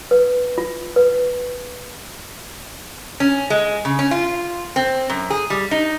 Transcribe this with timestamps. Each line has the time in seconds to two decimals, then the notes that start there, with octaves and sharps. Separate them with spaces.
0.11 B4
0.58 F4
0.96 B4
3.20 C#4
3.50 G#3
3.85 C#3
3.99 C#4
4.11 F4
4.76 C4
5.10 F#2
5.30 G#4
5.50 G3
5.71 D#4